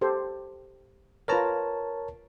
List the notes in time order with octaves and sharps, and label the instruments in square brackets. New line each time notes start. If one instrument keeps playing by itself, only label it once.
[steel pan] G4 A4 C5
[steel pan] F4 B4 A#5 [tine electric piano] A#4 C#5 A5